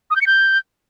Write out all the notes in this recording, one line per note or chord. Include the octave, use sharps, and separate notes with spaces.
D#6
G6
C#7
G6